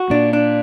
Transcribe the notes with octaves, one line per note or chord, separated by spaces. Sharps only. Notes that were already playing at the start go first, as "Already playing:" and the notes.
Already playing: F#4
A#2 A#3 D4
D4